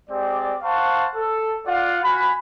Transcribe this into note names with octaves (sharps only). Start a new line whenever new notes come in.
G#3 C4 G4 D5
C5 F5 F#5 A5 C#6
A4
F4 D5 F5 F#5
F#4 F#5 G#5 B5